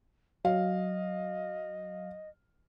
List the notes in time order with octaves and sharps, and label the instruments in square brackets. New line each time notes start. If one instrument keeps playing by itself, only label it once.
[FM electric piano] F#3 [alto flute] D#5 [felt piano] F5